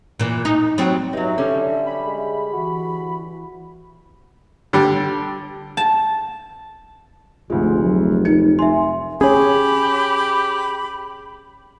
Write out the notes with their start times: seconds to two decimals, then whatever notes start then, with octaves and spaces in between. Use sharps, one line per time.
0.19 A#2 E3
0.45 D#4
0.78 F#3 G3 C4
1.13 G2 F#3 D#4 E5
1.38 D3 G3 C#4 A4
1.85 B5
2.06 G#3
2.53 E3 F#4
4.73 D3 G3
5.77 A5
7.50 F1 D2 G#3 F4
7.84 F#3
8.25 D#4 A#4 C#7
8.59 E5 G#5 C6
9.21 C#4 G4 G#4 C#5 B5